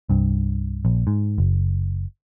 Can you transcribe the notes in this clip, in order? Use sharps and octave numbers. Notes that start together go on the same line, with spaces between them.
C2 G2
A#1
G#2
F#1